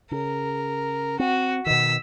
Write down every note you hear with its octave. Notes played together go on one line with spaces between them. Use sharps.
C#3 A#4
C4 F#4
B2 D#3 E6 B6